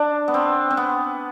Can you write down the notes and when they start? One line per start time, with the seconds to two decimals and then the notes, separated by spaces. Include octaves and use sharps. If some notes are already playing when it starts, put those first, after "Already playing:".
Already playing: D4
0.28 B3
0.34 C4
0.70 C4
0.77 B3